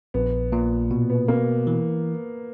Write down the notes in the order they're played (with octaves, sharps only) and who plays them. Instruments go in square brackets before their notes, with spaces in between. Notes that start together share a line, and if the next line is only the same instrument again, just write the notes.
[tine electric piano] A#1 [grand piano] B3
[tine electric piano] A#2
B2
[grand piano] B3
[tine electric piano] B2 [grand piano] A#3
[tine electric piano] E3